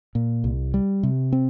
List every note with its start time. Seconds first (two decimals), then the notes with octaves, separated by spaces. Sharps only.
0.15 A#2
0.44 C2
0.74 G3
1.03 C3
1.32 C4